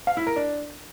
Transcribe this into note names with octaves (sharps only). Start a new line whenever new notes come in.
F5
E4
A#4
D4